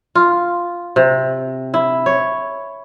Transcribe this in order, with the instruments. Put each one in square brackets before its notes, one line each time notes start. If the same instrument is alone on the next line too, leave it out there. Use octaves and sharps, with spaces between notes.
[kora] F4
C3
E4
C#5